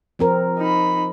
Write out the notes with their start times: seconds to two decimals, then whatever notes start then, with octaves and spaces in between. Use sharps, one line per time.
0.19 F3 C4 A#4
0.57 D#4 B5